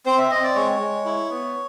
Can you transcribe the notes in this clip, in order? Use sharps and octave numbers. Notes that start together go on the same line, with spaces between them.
C4 C5
E5
C4 D#5
D5
G#3 C#5
G#3
E4
B3